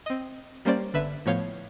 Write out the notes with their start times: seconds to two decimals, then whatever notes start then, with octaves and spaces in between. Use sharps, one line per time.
0.06 C4 D#5
0.65 G3 A#3 C#4 C5 D5
0.93 G1 D3 B4 E5
1.26 A2 F3 B3 C#5 F5 G6